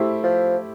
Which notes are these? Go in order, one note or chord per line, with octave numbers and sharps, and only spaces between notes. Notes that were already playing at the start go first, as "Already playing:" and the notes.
Already playing: A3 E4 G4 C5
F3